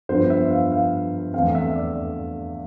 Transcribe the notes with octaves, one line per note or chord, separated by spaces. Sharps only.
G2 F3 B3 C5
E5
F5
F5
E2 D3 A3 C4 F5
E5
D5